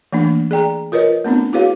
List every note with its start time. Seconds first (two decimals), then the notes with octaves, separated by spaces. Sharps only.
0.12 E3 A3 A#3 D4
0.51 G#4 D5 G5 A#5
0.92 F4 A#4 B4 C#5 D#5
1.24 A3 B3 C4 D4
1.53 E4 F#4 G#4 B4 C#5 F5